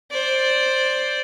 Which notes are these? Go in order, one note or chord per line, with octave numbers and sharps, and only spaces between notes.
C5 D5